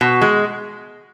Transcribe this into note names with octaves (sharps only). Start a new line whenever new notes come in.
B2
G#3